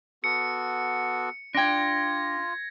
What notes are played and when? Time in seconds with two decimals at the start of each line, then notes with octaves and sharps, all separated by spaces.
0.24 B3 F#4 A4 C#7
1.55 D4 F4 G5 G#6 A#6